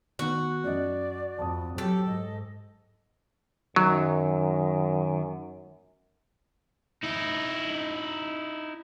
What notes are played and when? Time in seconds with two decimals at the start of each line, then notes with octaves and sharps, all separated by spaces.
0.19 D#3 B3 F#4 F#6
0.64 F#2 D5 D#5
1.39 F2 A5 D#6
1.78 F#3 G4 A4
2.06 G#2 D#5
3.76 F#2 D#3 F#3
7.03 D#4 E4